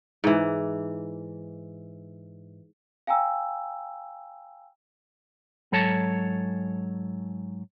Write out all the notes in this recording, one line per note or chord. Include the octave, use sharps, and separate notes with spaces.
G#2 E3
F5 G5 G#5 A#5 E6
G#2 F#3 A4 C#5 A5